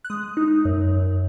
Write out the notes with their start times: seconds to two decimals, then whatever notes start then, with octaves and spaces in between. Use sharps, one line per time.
0.05 F#6
0.10 G#3 D#6
0.37 D#4
0.65 F#2
0.92 F#2